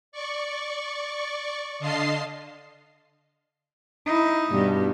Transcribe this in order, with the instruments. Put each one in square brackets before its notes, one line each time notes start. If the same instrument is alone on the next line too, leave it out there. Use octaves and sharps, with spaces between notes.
[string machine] D5 C#6
D3 D#5 F5 A5 C6 C7
[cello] D#4 E4
[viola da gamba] G2 B2 G3